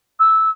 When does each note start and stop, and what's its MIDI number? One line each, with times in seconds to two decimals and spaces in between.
0.19 0.49 88